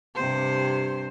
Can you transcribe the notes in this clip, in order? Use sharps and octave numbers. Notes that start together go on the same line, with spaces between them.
G2 C3 C5